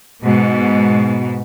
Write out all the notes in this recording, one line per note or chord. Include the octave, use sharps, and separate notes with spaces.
G#2 B2